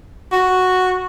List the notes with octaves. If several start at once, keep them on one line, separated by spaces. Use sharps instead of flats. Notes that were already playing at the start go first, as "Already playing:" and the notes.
F#4